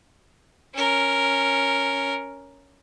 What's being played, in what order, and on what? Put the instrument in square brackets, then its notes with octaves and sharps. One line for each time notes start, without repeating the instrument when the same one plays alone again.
[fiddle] C#4 A#4